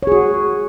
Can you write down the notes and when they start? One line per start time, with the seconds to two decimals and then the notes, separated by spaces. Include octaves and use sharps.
0.03 C#5
0.07 G#4
0.12 F#4